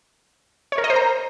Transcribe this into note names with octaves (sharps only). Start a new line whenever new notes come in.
C#5
A#4
D#5
C5
A#5